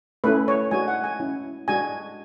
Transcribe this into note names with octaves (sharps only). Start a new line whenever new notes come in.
A3 C#4 E4 B4
C#5
G#3 D4 F#4 G#5
F#5
G#5
G#3 C#4 E4
G#3 D4 F#4 G#5